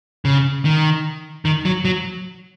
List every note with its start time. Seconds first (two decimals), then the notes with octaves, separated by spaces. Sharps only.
0.25 C#3
0.65 D#3
1.45 D#3
1.65 F#3
1.85 F#3